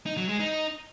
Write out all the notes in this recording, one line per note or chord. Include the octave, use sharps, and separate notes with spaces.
D#4
F#3
G#3
D#4